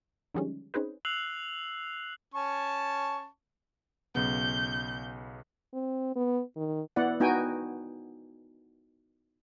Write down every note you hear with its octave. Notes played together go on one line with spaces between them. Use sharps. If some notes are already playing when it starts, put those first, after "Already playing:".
D3 D#3 F3 G3 G#3 C#4
C4 C#4 D#4 G#4 B4 C5
E6 F#6 C7 F7 F#7
C#4 A5 C#6
B1 C#3 B3 G6
C4
B3
D#3
B3 E4 D5 F#5
B3 D#4 F#4 G5 G#5